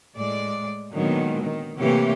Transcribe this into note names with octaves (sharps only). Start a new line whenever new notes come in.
A2 G#3 D5
A#2 D3 D#3 F#3 G#3 B3
D#3
C3 E3 A3 A#3 G4 C#5